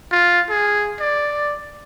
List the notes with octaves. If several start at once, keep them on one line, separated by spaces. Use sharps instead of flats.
F4
G#4
D5